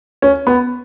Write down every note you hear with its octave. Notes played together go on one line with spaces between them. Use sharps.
C#4
B3